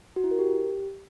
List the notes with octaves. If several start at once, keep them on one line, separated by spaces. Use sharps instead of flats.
F#4
E4
A#4
G4